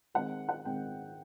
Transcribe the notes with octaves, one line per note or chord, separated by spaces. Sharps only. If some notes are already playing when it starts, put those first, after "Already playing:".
D#3 G#3 C4 F#5
F#5
D#3 G#3 C4 G5